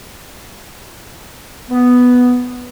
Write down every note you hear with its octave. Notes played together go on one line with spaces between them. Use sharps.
B3